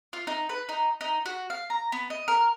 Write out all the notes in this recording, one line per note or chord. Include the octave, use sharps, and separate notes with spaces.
F4
D#4
B4
D#4
D#4
F#4
F5
A#5
B3
D#5
A#4